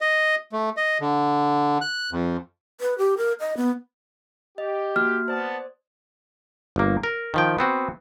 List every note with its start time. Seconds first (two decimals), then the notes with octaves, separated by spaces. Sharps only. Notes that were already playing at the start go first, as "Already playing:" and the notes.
0.01 D#5
0.52 A3
0.77 D#5
1.01 D3
1.81 F#6
2.11 F2
2.81 B4
2.98 G4
3.17 A#4
3.40 D#5
3.57 B3
4.58 G4 D#5
4.96 A#3 F#4 F6
5.28 B3 C5 D5 F#5 A5 D#6
6.76 G1 A#3
7.03 A#4
7.34 D#3 F3 G5
7.59 B3 C4 F#4